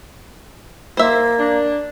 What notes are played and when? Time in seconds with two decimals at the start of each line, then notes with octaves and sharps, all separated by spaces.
0.97 A#3 C5 E5
1.39 D4